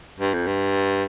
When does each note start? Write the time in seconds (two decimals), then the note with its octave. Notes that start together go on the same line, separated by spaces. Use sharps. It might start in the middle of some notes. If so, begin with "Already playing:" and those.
0.20 G2
0.34 F2
0.47 G2